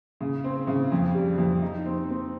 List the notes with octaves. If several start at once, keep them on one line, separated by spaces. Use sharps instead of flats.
C#3
C4
C#3
F2
G3
F2
D#4
C4
C4